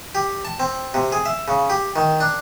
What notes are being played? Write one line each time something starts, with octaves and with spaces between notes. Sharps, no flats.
G4
A5
C4
C3
G#4
E5
C#3
G4
D#3
D4